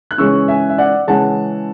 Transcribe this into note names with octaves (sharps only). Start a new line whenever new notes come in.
F#6
C#3 E3 G#3 C#4 C#6 E6
E5 G#5
E5
D5 F#5
C#3 E3 G#3 C#4 F#5 A5